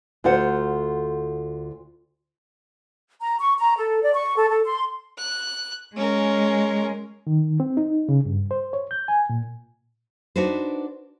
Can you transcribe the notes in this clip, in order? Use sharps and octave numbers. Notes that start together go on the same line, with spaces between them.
D2 F4 C5 F#5
A#5
C#6
A#5
A4
D5
C#6
A4
A4
C6
F#6
G#3 C#4 A#4
D#3
C4
D#4
C#3
G2
C5
C#5
G6
G#5
A#2
D4 D#4 F#4 B4 C5